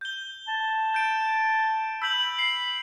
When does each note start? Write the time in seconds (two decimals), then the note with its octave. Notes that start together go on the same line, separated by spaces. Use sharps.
0.01 G6 G7
0.48 A5
0.94 G6 D7
2.02 B5 E6 G6 F#7
2.39 C7